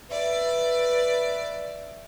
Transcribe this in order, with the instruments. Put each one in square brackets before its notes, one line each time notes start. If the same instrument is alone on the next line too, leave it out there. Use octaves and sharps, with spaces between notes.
[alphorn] B4 [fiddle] D5 [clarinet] E5